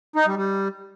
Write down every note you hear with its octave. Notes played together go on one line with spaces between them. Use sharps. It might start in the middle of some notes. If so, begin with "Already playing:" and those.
D#4
G3
G3